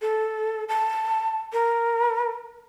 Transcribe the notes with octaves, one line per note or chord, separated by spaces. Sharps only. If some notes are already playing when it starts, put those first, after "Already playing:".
A4
A5
A#4